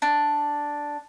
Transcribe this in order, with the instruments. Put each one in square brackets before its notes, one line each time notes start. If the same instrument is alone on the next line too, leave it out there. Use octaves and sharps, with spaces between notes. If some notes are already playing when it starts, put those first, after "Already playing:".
[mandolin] D4